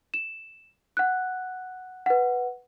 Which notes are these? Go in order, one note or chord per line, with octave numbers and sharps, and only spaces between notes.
E7
F#5 F#6
B4 F#5